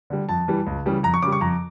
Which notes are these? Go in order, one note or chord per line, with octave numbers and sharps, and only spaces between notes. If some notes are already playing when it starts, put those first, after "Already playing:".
D3 G3
F2 A5
E3 G3
C#2
C#3 E3 G3
F2 A#5
C#6
C#3 G3 D6
C#6
F2 A#5